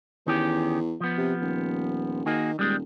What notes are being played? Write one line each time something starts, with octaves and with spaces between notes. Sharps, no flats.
E2 D#3 C#4 G4
F3 B3
C3
D#1
D#3 A#3 F#4 G#4
D#1 G3 G#3